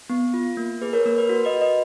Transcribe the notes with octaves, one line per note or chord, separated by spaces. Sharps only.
B3
F4
A#3
G#4 B4
A#4 C#5
A#3 A#4
B4
F#4
B4 D#5
F#4
B4 D#5